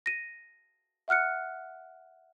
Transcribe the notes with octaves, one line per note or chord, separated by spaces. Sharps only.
A#6 D#7
E5 F#5 F6 F#6 C#7